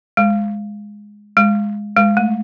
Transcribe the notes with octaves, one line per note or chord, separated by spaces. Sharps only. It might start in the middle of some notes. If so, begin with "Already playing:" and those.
G#3
G#3
G#3
A3